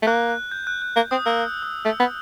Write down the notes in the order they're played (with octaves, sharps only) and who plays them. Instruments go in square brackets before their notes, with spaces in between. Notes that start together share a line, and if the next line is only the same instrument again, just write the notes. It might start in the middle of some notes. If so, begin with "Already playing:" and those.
[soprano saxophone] A3
[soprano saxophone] A#3 [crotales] F#6
[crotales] F#6
G6
F#6
F#6
[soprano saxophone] A#3
[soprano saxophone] C4 [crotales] D#6
[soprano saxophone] A#3 [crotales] E6
[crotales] D#6
[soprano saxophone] A3 [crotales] E6
[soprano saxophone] B3